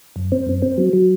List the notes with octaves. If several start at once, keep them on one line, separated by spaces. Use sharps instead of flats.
F#2
C4
F#2
C4
F#3
F#3